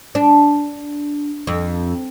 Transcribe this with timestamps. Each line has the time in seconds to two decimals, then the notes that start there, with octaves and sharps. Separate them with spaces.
0.15 D4
1.47 F2